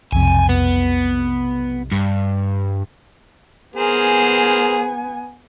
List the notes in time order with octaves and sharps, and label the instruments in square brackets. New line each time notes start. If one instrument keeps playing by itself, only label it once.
[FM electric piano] B1 F2 C3 [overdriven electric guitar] G#5
[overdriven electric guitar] B3
G2
[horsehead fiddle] B3 G#5 [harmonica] G#4 A#4 C5